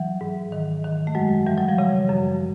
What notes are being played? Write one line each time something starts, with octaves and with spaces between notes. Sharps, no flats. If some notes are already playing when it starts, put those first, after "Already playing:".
Already playing: E3 F#3
G#2
D#3
D#3
A3
F#2 F#3 G#3
E3 G3
F#3
F3 G3
C#3
F#2